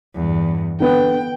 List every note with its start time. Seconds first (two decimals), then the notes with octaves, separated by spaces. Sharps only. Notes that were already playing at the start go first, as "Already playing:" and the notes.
0.15 E2 G2
0.80 D3 B3 G5